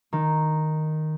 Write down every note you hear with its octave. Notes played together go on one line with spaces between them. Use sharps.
D#3